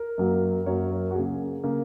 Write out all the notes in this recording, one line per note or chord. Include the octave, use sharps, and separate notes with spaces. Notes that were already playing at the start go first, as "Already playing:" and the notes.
Already playing: A#4
F#2 F#3 A#3
F#2 F#3 A#3 C#5
A#4
F#4
C#3 A#3 G#4
C#3 A#3